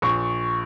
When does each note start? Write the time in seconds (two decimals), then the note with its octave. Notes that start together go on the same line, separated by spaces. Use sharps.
0.02 A#1 C#6